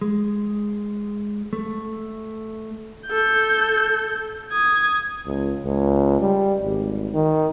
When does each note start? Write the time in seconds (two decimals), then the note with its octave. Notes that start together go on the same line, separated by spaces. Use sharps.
0.01 G#3
1.53 A3
3.07 A4 G6
4.52 D#6 G#6
5.26 C#2
5.65 C#2
6.21 G3
6.62 G#1
7.14 D#3